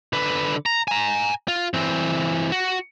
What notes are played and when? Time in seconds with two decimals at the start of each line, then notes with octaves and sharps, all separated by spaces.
0.13 D3 B4
0.66 A#5
0.88 G#5 A#5
1.48 F4
1.74 E3 C4
2.52 F#4